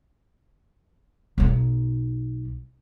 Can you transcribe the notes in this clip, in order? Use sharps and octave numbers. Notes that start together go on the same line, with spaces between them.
B1 D#4